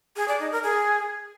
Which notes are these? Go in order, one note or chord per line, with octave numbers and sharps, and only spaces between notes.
G#4
D5
D#4
A#4
G#4